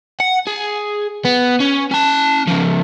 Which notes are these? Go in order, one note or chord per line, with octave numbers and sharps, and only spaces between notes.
F#5
G#4
B3
C#4
C#4 A5
C#3 F3